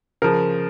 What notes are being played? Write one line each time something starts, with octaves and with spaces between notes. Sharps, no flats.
C#3 F3 A#4